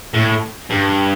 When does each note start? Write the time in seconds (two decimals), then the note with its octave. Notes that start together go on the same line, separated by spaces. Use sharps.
0.14 A2
0.70 G2